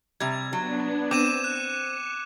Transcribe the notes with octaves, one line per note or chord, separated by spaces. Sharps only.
C3 G3 G#6
F#3 B3 D4
C4 D6 D#7 E7
F#6 C#7